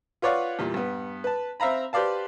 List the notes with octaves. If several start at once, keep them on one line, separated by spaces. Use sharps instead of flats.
F4 B4 C#5 D5 F5 F#5
E2 A#2 G3
G2 B3
B4 A5
C4 E5 F5 A#5 B5
G4 B4 C5 D5 F5 A5